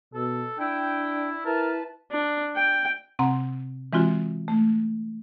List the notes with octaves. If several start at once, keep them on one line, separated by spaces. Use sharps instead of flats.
B2 A4
D4 E4 G5
E4 A#4 B4 A5
D4
G5
C3 C4 F#5 A#5 C6
E3 G#3 C4 F4 F#4
A3